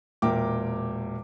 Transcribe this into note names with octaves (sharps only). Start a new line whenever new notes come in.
E1 A#2 A#4 E5 G5 D6